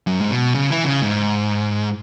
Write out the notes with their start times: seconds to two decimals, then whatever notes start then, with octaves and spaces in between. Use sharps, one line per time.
0.07 F#2
0.21 G#2
0.31 B2
0.54 C#3
0.71 E3
0.85 C#3
1.02 G#2